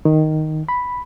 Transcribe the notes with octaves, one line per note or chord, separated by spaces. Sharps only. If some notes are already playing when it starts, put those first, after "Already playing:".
D#3
B5